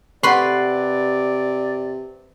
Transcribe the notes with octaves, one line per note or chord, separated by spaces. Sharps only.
C3 G4 B4 D5 F#5 B5 C6